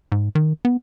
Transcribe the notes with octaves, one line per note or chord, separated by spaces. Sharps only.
G#2
D#3
B3